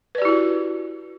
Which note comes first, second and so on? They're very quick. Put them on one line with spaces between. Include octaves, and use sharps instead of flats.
B4 D5 G4 E4 F#4